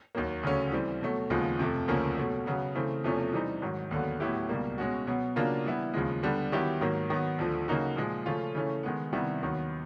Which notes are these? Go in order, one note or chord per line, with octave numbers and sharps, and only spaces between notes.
D#2 D#3 F#3 A#3
D2 C#3 F#3 A3 C#4
E3 G3 C4
B2 F#3 A3
D#2 C#3 F3 G#3 B3
F2 C3 F3 A3
D2 C#3 F3 A#3 C#4
B2 F#3 A3
C#3 F#3 B3
C#3 E3 A3 C4
E2 C3 F3 A3 C#4
E3 G3 C4 D#4
G#2 D#3 F#3
D#2 D3 F#3 B3
A2 F#3 B3 E4 G4
C#2 B2 G3 A#3
B2 G#3 C#4 F#4
B2 F#3 B3
C#3 F#3 A#3 D4 F4
E3 G3 B3 E4
D#2 C#3 F3 G#3
D3 G3 B3 D4
D#3 F#3 B3 E4 G4
G#2 D#3 F#3 A#3
D#3 F#3 B3
D2 D3 F3
C#3 F#3 A#3 D#4 F#4
A#2 F3 G#3
C#3 F3 A3 C#4 F4
C#3 E3 A3 C#4
D#3 G#3 B3
C3 D#3 G3 B3 E4
D#2 D#3 F#3 B3